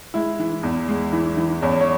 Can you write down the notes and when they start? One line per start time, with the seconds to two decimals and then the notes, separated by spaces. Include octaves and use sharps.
0.14 G#3 E4
0.40 E3
0.63 E2
0.88 G#3
1.13 E3
1.37 E3
1.62 E2 C#4
1.81 C#5